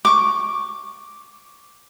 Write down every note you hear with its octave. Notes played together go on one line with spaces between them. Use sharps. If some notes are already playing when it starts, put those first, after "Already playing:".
C#6 D6